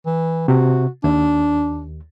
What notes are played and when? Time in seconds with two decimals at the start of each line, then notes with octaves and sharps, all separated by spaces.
0.06 E3
0.48 C3 F#4
1.04 D#2 D4